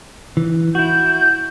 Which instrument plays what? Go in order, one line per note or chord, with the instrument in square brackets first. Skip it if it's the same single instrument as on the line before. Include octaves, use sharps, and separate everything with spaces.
[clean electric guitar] E3
[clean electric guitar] E4 F#4 [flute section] G6